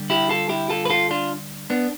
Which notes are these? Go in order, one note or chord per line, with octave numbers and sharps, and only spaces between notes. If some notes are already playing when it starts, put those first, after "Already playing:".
Already playing: D3 G3
E4 G4
F4 A4
E4 G4
F4 A4
B4
F4 A4
D4 F4
B3 D4